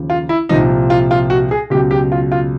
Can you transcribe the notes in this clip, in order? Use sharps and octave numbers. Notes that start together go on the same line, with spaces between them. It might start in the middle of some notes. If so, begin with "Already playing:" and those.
Already playing: D#2 C#3 F3
F4
E4
C2 A#2 F3 D#4
F4
F4
F#4
G#4
C#2 B2 F#3 G4
G4
F4
F4